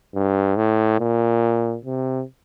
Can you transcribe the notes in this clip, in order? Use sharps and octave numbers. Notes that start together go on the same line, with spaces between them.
G2
A2
A#2
C3